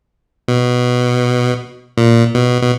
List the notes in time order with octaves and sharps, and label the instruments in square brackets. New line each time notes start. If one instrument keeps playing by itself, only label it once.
[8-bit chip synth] B2
A#2
B2
B2